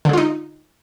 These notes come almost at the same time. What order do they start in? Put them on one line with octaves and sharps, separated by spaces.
D3 G#3 F4 D#4